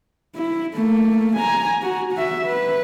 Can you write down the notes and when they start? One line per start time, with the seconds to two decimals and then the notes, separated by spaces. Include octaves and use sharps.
0.36 E4
0.75 A3 A#3
1.36 G#5 A#5
1.82 F#4
2.14 F#4 E5
2.46 B4